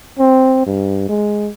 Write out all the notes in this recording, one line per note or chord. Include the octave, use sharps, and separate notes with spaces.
C4
G2
G#3